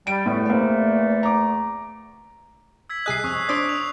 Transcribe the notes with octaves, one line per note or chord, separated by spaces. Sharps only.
G3 D7
E2 A2 A3
A#3 C4
A#5 D6
E6 G#6 B6
C2 G#4 D#5 F#6 C7
F2 C#5 C#6 D#6
D4 C5 D5 D#6 F#6 D7
D#6 F7